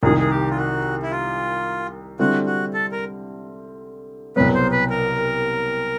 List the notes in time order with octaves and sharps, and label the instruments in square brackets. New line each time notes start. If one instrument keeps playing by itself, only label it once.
[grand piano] C2 C3 D#3 [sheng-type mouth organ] G#4
[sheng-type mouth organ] G#4
G4
F4
F#4
E4
F4
[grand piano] D3 G3 C4 E4 [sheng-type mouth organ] F#4
[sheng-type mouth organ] F#4
A4
A#4
[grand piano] C2 B2 F#3 B3 [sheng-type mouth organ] B4
[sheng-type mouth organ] C5
B4
A#4